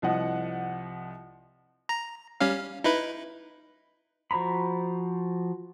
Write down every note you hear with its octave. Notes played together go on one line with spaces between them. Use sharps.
C2 F3 D#5 F#5
A#5
G3 C#4 F5
D#4 E4 B4
F3 F#4 C5 A#5 B5